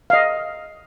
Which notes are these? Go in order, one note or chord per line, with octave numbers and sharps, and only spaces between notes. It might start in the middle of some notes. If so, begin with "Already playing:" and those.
D#5 F5